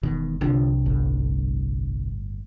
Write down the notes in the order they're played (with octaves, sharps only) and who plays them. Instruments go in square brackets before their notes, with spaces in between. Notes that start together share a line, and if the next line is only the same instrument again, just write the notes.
[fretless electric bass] E1 B2 D#3
[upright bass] C2 D4 [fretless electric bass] D3 F3
[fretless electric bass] G1 A2